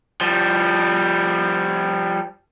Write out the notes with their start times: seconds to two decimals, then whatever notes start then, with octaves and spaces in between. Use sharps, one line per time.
0.21 F3 G3